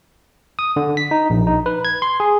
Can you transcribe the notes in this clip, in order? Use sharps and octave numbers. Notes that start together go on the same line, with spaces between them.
D#6
D3
B6
D#4
A#1
D#4
B4
G#6
C6
G#4